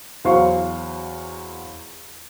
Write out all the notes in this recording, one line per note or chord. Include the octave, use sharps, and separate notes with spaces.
E2 F#3 F#4 C5 F5 C#6